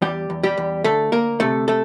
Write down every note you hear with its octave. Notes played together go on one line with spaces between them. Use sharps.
E2 G3 G4
E2
G3 G4
E2
D2 A3 A4
D2 A#3 A#4
C3 A3 A4
A3 A4